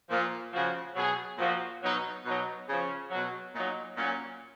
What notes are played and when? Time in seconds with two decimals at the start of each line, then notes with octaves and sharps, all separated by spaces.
0.10 A#2 F3 F4
0.53 C#3 F3 F#4
0.96 B2 F#3 G#4
1.38 A#2 F3 F#4
1.82 B2 F#3 D#4
2.25 B2 F#3 D#4
2.68 C#3 F3 C#4
3.11 B2 F#3
3.55 A#2 F#3 D#4
3.97 A#2 F#3 C#4